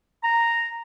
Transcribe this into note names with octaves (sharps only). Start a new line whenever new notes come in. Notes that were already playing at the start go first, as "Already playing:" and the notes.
A#5